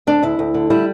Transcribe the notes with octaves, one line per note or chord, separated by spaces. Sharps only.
D2 D4
D2 E4
D2
D3
G3 E4